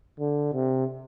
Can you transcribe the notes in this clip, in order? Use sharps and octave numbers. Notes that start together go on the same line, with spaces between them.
D3
C3